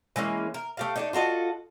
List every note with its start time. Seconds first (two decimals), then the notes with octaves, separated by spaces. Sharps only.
0.16 E3 G#3 A#3 C#4
0.54 A#4
0.77 A3 G4 F5
0.96 A3 D4 D#4
1.13 F4 F#4 A4 D#5